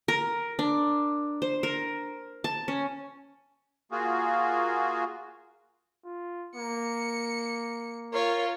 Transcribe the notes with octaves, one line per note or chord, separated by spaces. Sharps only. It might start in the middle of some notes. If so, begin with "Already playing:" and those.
A#4
D4
C5
A#4
A5
C#4
A#3 F4 F#4 G#4
F4
A#3 C#7
F4 A#4 C#5